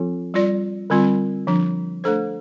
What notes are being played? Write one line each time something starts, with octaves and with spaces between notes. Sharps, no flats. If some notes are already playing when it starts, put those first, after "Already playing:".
Already playing: F3 C4 F4 A4
G3 F4 D5
D3 G3 C4 F4
D3 F3 D4
A3 D4 A4 C5